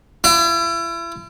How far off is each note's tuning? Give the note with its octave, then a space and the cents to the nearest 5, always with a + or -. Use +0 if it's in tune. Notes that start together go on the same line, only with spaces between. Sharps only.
E4 +40